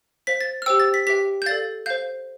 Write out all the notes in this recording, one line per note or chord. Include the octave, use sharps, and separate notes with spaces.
C5 F5 B6
A6
F6
G4 C5 G5 E6
A6
B6
G4 B4 E5 G5 B6
G6
A4 D5 F5 A6
C5 F5 G6